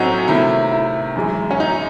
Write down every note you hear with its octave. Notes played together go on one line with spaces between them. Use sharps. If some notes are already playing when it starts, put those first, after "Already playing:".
Already playing: A2 F#3 C4 C#4 D#4 F#4
C3 D#3 A3 E4
E4
F#2 E3 G#3
C#4
D#4